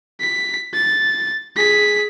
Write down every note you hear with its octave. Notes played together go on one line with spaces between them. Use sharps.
B6
A6
G#4 B6